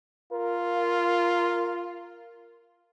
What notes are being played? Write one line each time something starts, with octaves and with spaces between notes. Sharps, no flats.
F4 A#4